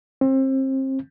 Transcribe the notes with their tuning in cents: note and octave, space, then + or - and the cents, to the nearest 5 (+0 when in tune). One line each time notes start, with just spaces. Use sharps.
C4 +30